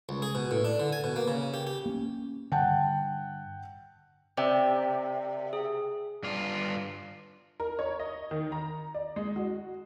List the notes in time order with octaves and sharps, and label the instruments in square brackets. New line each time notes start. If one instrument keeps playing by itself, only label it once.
[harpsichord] C#2
G#4
B2
A2
D4
D3
G#5
B2
A#3
C#3
G4
G4
[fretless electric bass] A#3 B3 C#4
[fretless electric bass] G2 D3 [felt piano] F#5 G5 A5
[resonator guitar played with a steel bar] C3 [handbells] C5 D5 G5
[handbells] G#4
[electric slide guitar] G2 F4
[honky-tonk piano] A#4
C#5
D#5
D#3
A#5
D5
G#3
F#4